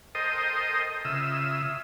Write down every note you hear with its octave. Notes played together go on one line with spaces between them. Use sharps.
A4 A#4 C5 D#5 G5 D#6
C#3 F4 E5 D#6 E6